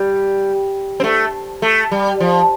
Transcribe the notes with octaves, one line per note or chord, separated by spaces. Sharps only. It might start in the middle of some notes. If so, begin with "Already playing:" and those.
Already playing: G3
C4
A3
A3
G3
F3